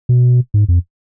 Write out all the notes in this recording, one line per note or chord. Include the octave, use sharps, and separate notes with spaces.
B2
G#2
F2